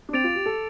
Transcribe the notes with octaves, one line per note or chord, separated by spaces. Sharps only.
D4
C4 D6 A6 D7 F7
F4
G4
A4